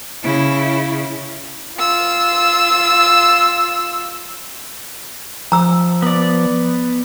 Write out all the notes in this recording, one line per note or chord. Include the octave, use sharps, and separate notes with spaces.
C#3 E4
F4 E6
F3 A#5 E6
B3 D5